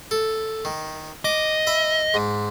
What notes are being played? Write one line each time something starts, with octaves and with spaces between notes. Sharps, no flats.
A4
D#3
D#5 D6
E5 B5
G#2